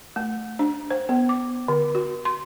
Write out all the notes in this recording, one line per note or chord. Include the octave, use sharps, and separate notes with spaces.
A3
D4
C5
B3
D6
D3
F#4
C6